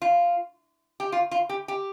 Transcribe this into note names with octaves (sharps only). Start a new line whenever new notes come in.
F4
G4
F4
F4
G4
G4